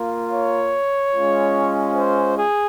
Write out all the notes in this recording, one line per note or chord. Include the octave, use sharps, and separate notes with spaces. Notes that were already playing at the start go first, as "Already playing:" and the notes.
Already playing: A#3 F4
C#5
G#3 C#4 F4
C5
G#4